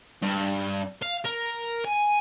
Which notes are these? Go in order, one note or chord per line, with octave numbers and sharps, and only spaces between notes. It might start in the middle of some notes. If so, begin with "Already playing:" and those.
G2
F5
A#4
G#5